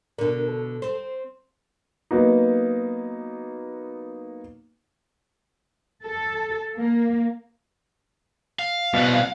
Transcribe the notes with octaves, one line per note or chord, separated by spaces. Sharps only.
B2 D3 D4 A#4
A4
C4 C5
F#3 A#3 B3 D#4
A4
A#3
F5
C2 B2 F#5